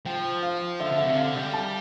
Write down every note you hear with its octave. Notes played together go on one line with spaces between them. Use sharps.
F3 G5
F5
D3 E5
D3
E5
C3
D3 F5
G3
A5